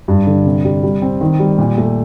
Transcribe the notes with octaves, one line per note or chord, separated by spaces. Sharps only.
G2
D3
C3
G3
G3
C4
D#3
G3
A#2
A3